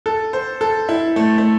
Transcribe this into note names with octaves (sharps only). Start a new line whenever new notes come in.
A4
C5
A4
E4
A3
A3